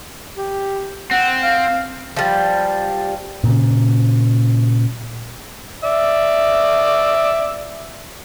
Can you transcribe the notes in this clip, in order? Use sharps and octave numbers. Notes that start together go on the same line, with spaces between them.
G4
C4 F#5
F5
F3 G3
A#2 C#3
D5 E5